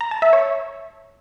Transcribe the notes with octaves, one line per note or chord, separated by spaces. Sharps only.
A#5
A5
E5
C#5